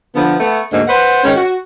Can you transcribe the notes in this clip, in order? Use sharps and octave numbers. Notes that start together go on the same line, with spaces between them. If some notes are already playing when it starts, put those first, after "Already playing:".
D3 F3 B3
A3 B3
D2 G#2 D3 A#3
B4 C5 F#5
G#2 D#3 C#4
F#4